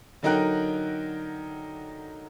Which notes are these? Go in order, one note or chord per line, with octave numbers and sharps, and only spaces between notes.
D3 F#3 D#4 A#4 G5 F#6